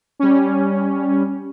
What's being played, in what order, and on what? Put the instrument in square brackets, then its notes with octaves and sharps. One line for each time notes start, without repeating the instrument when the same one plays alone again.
[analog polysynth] G3 C#4